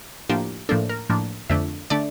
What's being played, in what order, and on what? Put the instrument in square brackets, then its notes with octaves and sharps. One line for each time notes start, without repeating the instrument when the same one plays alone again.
[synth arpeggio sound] A2 F3 A#3 D4 G4
A2 F3 A#3 D4 A4
A#4
A2 F3 A#3 D4
F2 D3 A3 D4 E5
D3 A3 D4 D5